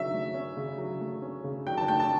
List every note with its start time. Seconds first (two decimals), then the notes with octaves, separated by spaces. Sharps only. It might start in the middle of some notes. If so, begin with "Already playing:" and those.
Already playing: C#3 F#3 C#4 E5
0.13 A3
0.34 C#4
0.57 C#3
0.78 F#3
1.00 A3
1.22 C#4
1.44 C#3
1.67 F#3 G5
1.77 A5
1.88 A3 G5
2.00 A5